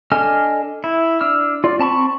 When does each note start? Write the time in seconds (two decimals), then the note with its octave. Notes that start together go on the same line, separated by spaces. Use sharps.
0.12 D4 A4 D#5 G#5 F6
0.84 E4
1.21 D4 E6 F6
1.64 F4 D5
1.79 C4 A5 B5 C#6